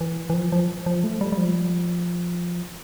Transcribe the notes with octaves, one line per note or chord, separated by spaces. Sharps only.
E3
E3
F3
F3
F3
A3
G3
G3
F3